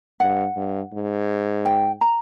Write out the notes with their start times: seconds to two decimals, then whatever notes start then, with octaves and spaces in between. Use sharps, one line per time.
0.20 G2 F#5
0.56 G2
0.93 G#2
1.65 G5
2.01 A#5